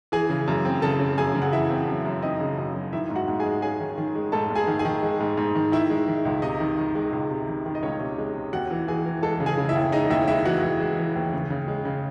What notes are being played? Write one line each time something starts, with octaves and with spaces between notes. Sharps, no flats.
E3 G#4 G#5
C#3
F#2
C4
C#3 A4 A5
C#3
F#2 G#4 G#5
C#3
F#5
E3 E4 E5
C4
F#2
F#2
C4 D#4 D#5
C#3
F#2
F#2
D#3 E4 E5
G#2
F#4 F#5
G#2
G#4 G#5
G#3
C#4 G#4 G#5
D#3
D#3
G#3
G#2 A4 A5
G#2
G#4 G#5
D#3
G#4 G#5
D#3
G#3
G#2
G#2
D#3
D#3 E4 E5
G#3
D#3
C#2
C3 D#4 D#5
D#3
D#3
G#3
C#2
C3
D#3
D#3
D#5
C#2 C#4 C#5
C3
G#3
C3
D#2 F#4 F#5
E3
E3 G#4 G#5
E3
G#3 A4 A5
C#3
G#4 G#5
C#3
E4 E5
D#2
G#3 D#4 D#5
D#2 E4 E5
G#3 E4 E5
E3 F#4 F#5
E3
G#3
E3
D#2
C#3
C#3
G#3
C#3